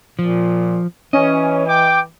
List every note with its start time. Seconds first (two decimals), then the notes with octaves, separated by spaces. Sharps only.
0.19 A#2 F3
1.13 E3 C#4 D#5
1.69 G5 D6